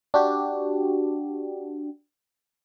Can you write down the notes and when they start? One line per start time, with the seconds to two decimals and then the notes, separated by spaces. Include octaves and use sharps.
0.14 D4 F#4 G4